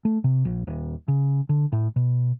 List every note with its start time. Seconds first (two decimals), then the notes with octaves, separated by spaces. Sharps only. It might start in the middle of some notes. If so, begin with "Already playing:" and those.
0.05 A3
0.24 C3
0.45 A#1
0.67 D#1
1.08 C#3
1.49 D3
1.72 A2
1.96 B2